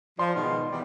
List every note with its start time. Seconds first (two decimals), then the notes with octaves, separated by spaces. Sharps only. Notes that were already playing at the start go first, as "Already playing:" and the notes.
0.19 F3 D5 C6
0.35 G#2 B2 D#3
0.71 E2 G3